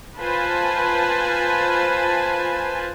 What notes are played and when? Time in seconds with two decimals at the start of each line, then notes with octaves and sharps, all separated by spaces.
0.18 F4 B4 C5 G#5 A5